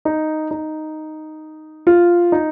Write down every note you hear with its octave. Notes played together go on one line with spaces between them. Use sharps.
D#4
D#4
F4
D#4